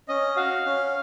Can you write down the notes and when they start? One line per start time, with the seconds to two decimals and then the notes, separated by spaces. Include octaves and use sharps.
0.08 C#4 D#5
0.36 F#4 F5
0.66 C#4